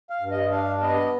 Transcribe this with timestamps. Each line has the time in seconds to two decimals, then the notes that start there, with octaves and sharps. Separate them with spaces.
0.10 F5
0.21 G2
0.31 D#5
0.51 D4 F5
0.82 B3 D#5